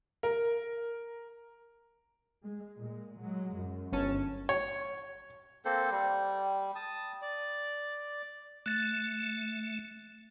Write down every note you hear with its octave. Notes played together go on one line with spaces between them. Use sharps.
A#4
G#3
A#2 G#3
F#3 G#3
F#2
G1 C#4 A5
C#5
A#3 C4 A4 C5
G3
A5 D#6
D5
A3 F#6 A6